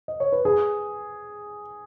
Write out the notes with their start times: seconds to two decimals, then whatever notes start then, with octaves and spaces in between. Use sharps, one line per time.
0.08 D#5
0.20 C#5
0.32 B4
0.45 G#4